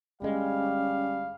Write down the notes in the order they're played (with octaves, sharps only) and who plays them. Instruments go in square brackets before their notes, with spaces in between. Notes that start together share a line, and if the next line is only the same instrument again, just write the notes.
[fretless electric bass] G1 G#3 [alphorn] G3 [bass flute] C#4 [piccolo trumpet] F5